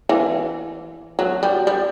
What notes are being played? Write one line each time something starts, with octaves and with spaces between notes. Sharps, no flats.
E3
F#3
G3
G3